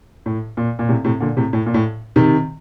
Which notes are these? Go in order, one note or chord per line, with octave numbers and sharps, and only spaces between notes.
A2
A#2
A#2
A2 C3
A2 C3
A#2 D3
A2 C3
A2
A#2
A2
C3 D#3